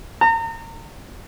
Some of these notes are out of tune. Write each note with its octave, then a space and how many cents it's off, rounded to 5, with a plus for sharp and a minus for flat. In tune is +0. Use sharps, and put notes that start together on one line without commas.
A#5 -35